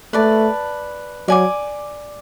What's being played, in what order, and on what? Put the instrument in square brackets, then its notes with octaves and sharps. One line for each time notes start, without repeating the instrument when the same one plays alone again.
[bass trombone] A3 [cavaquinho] B4 D5 A5
[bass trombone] F#3 [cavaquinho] D5 G#5 D6